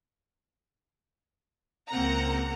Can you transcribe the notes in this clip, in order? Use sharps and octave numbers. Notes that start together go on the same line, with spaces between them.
C#2 A#3 C4 F#5 A#5